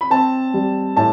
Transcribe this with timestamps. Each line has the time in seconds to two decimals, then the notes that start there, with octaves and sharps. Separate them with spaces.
0.01 B5
0.10 C4 A5
0.54 G3
0.96 A2 A5